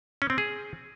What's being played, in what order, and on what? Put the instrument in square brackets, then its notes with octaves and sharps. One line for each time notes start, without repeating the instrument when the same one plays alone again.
[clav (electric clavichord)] C#4
C4
G#4